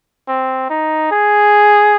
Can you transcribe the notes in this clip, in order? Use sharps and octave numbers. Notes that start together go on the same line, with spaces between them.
C4
D#4
G#4